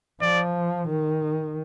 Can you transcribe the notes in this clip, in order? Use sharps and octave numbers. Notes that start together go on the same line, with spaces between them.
F3 D5
D#3